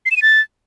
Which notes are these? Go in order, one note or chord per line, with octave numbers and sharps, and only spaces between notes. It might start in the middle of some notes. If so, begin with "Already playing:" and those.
C7
E7
D#7
A6